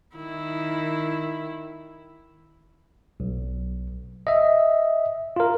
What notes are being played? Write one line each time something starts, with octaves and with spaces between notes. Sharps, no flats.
D#3 E4
B1
D#5 E5
F4 A#4